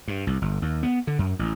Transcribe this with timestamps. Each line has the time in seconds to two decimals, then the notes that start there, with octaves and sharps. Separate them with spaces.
0.08 G2
0.27 C2
0.42 G1
0.62 D#2
0.83 B3
1.07 D3
1.19 F#2
1.39 A1